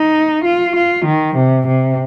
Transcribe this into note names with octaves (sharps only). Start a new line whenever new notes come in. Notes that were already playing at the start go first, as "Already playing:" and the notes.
Already playing: D#4
F4
F4
D#3
C3
C3